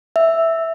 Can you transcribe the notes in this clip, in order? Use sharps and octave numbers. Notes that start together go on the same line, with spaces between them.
E5